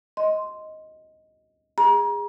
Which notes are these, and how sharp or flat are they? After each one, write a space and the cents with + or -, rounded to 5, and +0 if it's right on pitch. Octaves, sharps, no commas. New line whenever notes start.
D#5 +10 C6 -5
G#4 -20 A#5 +35